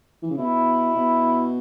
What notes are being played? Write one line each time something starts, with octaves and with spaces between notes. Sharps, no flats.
E3
C#3
B2 E4
B2